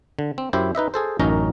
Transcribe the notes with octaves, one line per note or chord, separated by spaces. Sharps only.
D3
C4
F#2 E4 G4 C5
D#4 B4 D#5 E5
G#4 A4 C5
A1 F#2 C#4 D#4 A#4 A#5